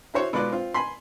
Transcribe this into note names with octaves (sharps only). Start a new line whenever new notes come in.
E4 F#4 C5 C#5
B2 G#3 F4 B4 D5 F#6
C4 F4
G#5 B5 C6